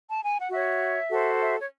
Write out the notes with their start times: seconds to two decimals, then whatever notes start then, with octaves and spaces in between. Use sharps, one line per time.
0.09 A5
0.23 G#5
0.37 F#5
0.50 F#4 C#5 E5
1.09 F#4 A4 C5
1.39 E5
1.61 C#5